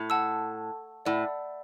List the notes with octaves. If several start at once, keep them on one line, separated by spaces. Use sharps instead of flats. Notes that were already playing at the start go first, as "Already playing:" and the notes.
Already playing: A2
F#5 A5 E6
A2 D5 F#5 B5 E6